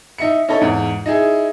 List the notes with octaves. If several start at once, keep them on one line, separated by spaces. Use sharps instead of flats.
D#4 E5 C#7
C#4 D#4 E4 A4 C#5 D#5
E2 G#2
D#4 E4 G#4